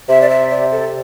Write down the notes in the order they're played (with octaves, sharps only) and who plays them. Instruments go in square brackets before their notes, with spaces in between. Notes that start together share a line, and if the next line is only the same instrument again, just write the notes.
[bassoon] C3 [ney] E5
[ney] D5
E5
D5
A4